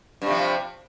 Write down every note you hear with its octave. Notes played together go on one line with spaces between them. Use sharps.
G2 C3 F3